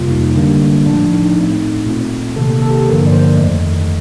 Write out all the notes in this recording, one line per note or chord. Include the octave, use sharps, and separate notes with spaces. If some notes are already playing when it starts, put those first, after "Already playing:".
Already playing: F2 C3 G3 A#3 F4
D#4
D3 G3 A#3 D4
A2 F3 A3 D4
D#4
A2 A3 C4
A#2 A3 C4 F4
C3 D#3 A#3 A4
A4
G4
A4
G2 D3 F3 A#3 A#4
D5
C5
F2 D#3 A3 D#5